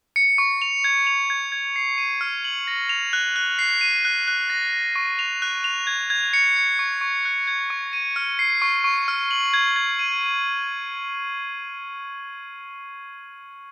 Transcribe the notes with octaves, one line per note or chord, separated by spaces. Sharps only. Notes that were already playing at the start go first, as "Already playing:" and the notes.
C#7
C#6
F7
G#6
F7
G#6
G#6
C7
D#7
F6
F#7
A#6
F7
F#6
F#6
C7
D#7
F#6
F#6
A#6
A#6
C#6
F7
F#6
F7
G#6
G#6
C#7
C#7
C#6
C#6
F#6
G#6
C#6
D#7
F6
C7
C#6
C#6
F6
F#7
G#6
G#6
D#7
D#7